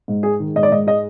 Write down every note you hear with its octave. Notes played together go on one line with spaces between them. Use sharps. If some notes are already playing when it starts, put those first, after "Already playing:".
G#2
G#3 G#4
D#3
G#2 D#5
D5
G#2 D#5
G#3 D#5